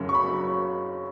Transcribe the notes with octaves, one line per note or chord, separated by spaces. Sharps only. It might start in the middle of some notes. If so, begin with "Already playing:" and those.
Already playing: F#1 F#2 C#3 F#3
C#6
B5